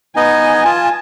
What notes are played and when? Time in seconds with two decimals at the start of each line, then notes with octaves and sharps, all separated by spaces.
0.16 B3 D#4 D#5 G#5
0.65 F4 A5